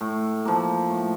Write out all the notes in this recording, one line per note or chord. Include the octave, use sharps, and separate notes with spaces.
A2
F3 A#3
A2